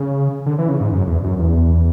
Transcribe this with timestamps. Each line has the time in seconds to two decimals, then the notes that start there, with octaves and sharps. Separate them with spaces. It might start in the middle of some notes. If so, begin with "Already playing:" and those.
Already playing: C#3
0.46 D3
0.58 E3
0.69 C#3
0.81 G#2
0.92 F#2
1.07 E2
1.23 F#2
1.39 E2